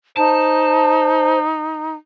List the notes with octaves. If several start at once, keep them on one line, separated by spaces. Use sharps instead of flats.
D#4 C5 A5